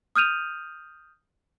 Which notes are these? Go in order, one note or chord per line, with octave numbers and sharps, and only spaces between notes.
D#6 F6 G6 D#7 F7